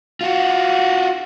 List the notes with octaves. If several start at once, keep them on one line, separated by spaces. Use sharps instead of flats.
F4 F#4